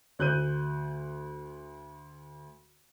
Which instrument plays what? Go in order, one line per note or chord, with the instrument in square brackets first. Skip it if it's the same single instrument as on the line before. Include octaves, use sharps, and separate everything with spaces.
[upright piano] D2 F#6 G6 D#7